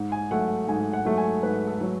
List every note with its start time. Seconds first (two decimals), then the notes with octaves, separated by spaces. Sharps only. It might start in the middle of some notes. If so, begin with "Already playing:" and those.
Already playing: G#2
0.12 G#5
0.31 F#3 A3 F#5
0.68 G#2 G#5
0.93 F#5
1.05 F#3 A3
1.18 G#5
1.43 G#2 B4
1.68 A4
1.81 F#3